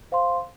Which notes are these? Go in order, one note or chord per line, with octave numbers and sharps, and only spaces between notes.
C5 F5 C6